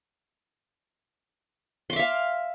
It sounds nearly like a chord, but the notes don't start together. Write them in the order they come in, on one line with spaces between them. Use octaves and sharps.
C6 D6 E5 F5